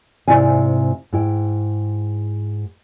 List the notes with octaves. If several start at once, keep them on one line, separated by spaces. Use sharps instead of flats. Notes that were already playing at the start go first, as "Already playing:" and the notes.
G#2 C3 E4 D5 F5 G#5
G#2 E4 G5